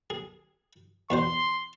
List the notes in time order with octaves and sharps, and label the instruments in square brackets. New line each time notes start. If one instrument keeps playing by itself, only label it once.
[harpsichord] G#4
[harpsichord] E2 B2 C5 [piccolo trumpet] C6